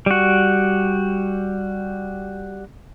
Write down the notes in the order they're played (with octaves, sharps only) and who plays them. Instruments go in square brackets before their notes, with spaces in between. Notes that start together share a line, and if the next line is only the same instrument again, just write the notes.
[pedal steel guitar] G3 F#4